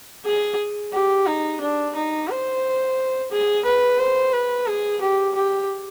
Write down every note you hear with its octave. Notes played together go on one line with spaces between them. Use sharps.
G#4
G4
D#4
D4
D#4
C5
G#4
B4
C5
B4
G#4
G4
G4